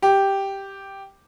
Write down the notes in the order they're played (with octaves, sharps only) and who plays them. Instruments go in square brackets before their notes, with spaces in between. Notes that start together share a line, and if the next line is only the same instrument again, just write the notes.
[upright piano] G4